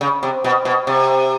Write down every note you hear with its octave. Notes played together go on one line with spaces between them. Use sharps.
C#3
C3
B2
B2
C3